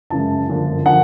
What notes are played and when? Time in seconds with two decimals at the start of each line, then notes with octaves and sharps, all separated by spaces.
0.10 F#2 C#3 E3 G#3 A5
0.48 G1 F#2 D3 F3 A#3
0.86 D3 F3 A#3 F#5